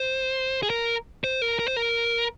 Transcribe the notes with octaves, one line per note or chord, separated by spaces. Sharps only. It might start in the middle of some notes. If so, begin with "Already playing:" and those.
Already playing: C5
G#4
A#4
C5
A#4
A#4
C5
A#4